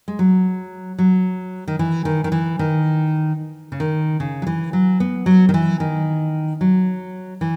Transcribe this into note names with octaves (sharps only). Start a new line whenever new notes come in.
G#3
F#3
F#3
D#3
E3
D#3
D#3
E3
D#3
C#3
D#3
C#3
F#3
E3
F#3
B3
F#3
D#3
E3
D#3
F#3
E3